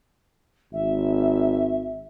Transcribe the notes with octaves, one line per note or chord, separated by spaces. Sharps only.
G#1 E5